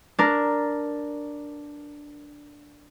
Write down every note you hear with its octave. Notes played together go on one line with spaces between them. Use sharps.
D4 A#4